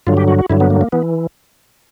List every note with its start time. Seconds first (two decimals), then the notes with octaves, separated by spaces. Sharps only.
0.07 G2 D3 F#3 F4
0.17 G4
0.28 F#4
0.39 F#4
0.50 G2 D3 F#3 E4
0.60 B3
0.70 A#3
0.81 A#3
0.92 E3 B3